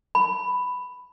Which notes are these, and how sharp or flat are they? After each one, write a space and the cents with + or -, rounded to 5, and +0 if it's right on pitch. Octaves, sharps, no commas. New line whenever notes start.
B5 +5